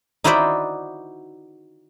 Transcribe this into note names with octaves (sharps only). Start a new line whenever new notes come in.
D#4 E4 F#4 C5 D5 E5